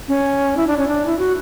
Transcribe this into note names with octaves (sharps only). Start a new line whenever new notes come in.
C#4
E4
D4
C#4
D4
E4
F#4